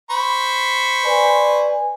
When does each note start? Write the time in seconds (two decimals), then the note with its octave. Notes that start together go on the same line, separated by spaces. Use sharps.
0.10 C5 B5 C#6
1.05 B4 D5 G#5